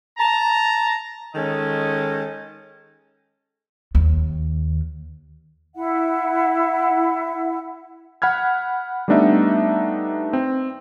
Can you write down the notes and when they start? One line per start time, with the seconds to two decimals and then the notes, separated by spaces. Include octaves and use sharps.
0.18 A5 A#5
1.34 D#3 G#3 C#4 A4 D#5
3.95 D#2
5.75 E4 E5 F#5
8.22 F#5 B5 F6 G#6
9.08 G3 A3 B3 D4 D#4 E5
10.33 C4